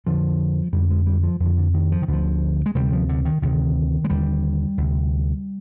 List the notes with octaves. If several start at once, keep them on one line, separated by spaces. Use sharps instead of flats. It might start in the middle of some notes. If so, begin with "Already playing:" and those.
F2 D3 F3
F2 D3 G3
G#3
G3
F3
F2 D3 F3
D3
D#3
F3
D#3
D2 D3 F3
G#3
D2 C3 G3
F3
D3
D#3
D2 C3 D#3
G#3
D#2 D3 G3
D2 C3